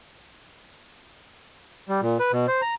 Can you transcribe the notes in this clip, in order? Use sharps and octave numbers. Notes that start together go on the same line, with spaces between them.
G3
A#2
B4
B2
C5
A#5